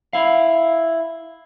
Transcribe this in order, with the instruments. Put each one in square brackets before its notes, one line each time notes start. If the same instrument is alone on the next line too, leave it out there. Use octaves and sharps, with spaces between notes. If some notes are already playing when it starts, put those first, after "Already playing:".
[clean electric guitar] E4 F5